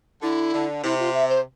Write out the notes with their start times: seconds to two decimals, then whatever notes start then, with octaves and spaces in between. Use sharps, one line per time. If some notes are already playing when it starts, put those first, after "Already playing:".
0.22 D3 E4
0.53 D3
0.83 C3 E4
0.99 F4
1.14 E5
1.29 C5